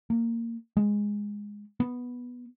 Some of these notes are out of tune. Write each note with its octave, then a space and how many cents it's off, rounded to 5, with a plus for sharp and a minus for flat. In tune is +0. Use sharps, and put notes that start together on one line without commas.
A#3 -15
G#3 -10
B3 -5